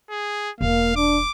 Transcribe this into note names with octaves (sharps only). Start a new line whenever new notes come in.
G#4
E1 A#3 F5
D4 D6